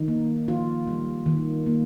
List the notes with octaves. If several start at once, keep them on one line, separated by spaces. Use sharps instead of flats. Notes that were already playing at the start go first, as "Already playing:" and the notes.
Already playing: D#3 D#4
A#3
D#3 F4
G3
D#3
A#3